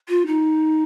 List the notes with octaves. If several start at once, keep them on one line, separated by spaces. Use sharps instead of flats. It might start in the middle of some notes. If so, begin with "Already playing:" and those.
F4
D#4